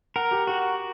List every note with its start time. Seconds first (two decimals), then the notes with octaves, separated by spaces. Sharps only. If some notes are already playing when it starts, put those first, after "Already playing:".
0.16 A#4 F#5
0.31 G4
0.47 F#4 G4